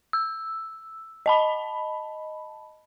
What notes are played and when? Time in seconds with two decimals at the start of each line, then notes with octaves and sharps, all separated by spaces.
0.13 E6
1.26 D#5 A5 B5